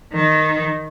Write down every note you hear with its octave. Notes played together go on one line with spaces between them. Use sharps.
D#3